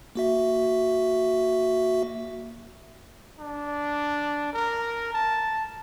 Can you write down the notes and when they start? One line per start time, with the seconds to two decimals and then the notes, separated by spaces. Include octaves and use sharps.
0.15 A#3 F#4 E5
3.39 D4
4.53 A#4
5.13 A5